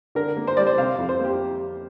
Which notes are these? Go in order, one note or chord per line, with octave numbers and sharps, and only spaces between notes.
D3 A#4
A#3
C5
G3 D5
C5
C3 F5
F2
C5
A#3 G4